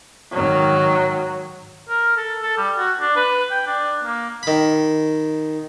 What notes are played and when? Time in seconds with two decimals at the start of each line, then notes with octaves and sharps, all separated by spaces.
0.32 G#2 D#3 F#3
1.89 A#4
2.17 A4
2.42 A4
2.58 G3
2.78 F#4
3.01 D4
3.16 B4
3.51 G5
3.67 D4
4.04 A#3
4.43 D#3 B5